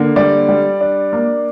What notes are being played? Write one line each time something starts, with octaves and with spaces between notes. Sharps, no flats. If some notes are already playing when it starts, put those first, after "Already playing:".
Already playing: D3 A#3
G3 D5
G3
D4
A#3